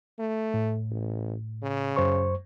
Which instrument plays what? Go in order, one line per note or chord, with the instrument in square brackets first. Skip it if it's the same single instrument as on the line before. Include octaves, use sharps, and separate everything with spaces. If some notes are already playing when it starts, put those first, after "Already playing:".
[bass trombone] A3
[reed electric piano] A2
[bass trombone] A1
C#3
[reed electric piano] F#2 C5 C#6